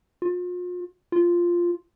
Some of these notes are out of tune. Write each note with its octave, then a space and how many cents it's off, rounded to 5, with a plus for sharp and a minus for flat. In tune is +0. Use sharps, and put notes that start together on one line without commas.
F4 +40
F4 -5